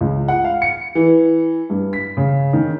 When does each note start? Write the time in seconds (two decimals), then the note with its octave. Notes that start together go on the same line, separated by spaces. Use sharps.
0.01 C#2
0.28 F#5
0.44 F5
0.62 C#7
0.95 E3
1.70 G2
1.93 B6
2.17 C#3
2.53 D#3